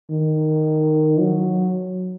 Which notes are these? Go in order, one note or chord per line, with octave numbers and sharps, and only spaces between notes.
D#3
F#3